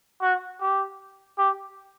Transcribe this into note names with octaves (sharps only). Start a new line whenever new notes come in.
F#4
G4
G4